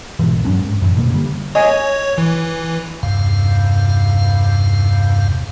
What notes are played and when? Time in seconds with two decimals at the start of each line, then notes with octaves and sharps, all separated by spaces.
0.19 E1 B1 G#2 E3
0.45 G2 F#3 C#4 D4
0.61 G#2
0.82 F#2 A2 E3
0.96 B2 D#3 F3 A#3
1.10 D3 G3
1.55 C#5 D#5 G#5
2.18 E3
3.03 E2 G2 C3 F5